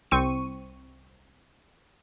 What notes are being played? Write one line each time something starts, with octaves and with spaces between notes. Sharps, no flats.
C2 C4 C#6 D#7